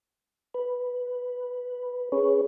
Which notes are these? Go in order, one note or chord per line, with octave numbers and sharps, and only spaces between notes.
B4
C#4 G#4 B4 C#5